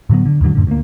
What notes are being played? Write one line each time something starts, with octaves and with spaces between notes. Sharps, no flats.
A2 D3 F#3 B3
D3
D#2 G#2 D3 F#3
F#2 A2 D3
D2 A#3